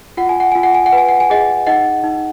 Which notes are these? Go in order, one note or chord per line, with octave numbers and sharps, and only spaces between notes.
F4 F#5
G#5
F#5
F4 G#5
F#5
G#5
F#5
B4
G#5
F#5
G#5
G#4 D#5 F#5
D#4 D#5 F#5
D#4